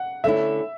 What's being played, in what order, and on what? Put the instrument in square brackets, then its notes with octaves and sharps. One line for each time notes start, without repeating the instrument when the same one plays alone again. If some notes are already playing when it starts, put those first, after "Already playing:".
Already playing: [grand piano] F#5
[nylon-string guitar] D3 A3 C#4 E4 [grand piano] E5